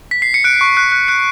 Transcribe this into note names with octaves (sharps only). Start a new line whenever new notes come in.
B6
C7
C#7
F#6 D7
C#6
F#6
F#6
F#6 C#7